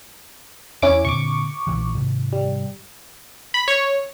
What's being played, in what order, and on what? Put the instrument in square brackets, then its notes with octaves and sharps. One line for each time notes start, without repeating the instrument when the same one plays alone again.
[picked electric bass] E2 [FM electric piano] C#4 E4 D6
[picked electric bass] A#2 D3 C4 [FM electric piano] C#6 D6
[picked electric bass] A#1 A#2 E3
G#2 C3 D#3
[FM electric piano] G3
[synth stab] B5
C#5